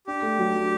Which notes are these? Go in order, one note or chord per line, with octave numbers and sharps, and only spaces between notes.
D4 G4
A3
F#3
D4